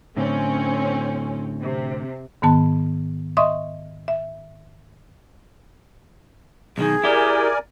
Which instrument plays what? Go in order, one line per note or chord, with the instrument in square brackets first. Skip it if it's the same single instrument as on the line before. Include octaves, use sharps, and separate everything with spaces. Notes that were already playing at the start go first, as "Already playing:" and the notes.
[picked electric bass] A2 D3 [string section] C4 C#4
[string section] C3
[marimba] G#2 D#3 B3 A5
D#5 E5 C6 C#6 D#6
E5
[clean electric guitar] B1 D#3 [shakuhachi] G#4
[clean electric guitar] E4 G4 [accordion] A#4 D5 G#5